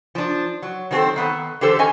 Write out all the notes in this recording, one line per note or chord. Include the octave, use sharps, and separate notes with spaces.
F3 D4
F#3
D#3 F#3 C4 G4 A4 C5
D#3 B3 A4
D3 E3 G4 A4 C5
C#4 D#5 G#5